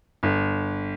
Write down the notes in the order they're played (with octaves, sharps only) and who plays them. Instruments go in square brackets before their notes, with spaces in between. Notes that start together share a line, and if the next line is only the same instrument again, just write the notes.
[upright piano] G1